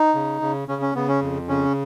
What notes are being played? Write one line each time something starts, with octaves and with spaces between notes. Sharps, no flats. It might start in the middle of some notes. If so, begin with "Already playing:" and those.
Already playing: D#4
C#3
C#3
C#3 C#4
C#4
C#3 B3
C#4
F2
C#3 C#4